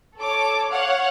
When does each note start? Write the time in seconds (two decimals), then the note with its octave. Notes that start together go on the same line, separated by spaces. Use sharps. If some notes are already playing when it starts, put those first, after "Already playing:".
0.18 A4 C#5 D6
0.71 C#5 F5 F#5